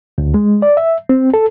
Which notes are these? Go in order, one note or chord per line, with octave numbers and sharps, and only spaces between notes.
D2
G#3
D5
E5
C4
A4